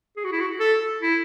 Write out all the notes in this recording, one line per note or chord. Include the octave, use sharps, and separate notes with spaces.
G#4
F#4
E4
F#4
A4
E4